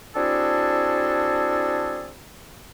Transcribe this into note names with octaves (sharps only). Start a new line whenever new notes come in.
C4 D4 E4 F#4 G#4 A4